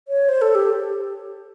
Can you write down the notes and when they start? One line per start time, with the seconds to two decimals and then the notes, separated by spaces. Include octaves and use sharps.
0.08 C#5
0.29 C5
0.41 A4
0.55 G4